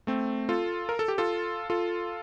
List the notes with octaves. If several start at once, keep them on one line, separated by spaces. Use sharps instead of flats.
A3 C4
F4 A4
A#4
A4
G4
F4 A4
F4 A4